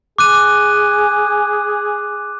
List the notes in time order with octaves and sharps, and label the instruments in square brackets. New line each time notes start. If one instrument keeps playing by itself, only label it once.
[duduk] G#4 [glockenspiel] D6 F#6 D#7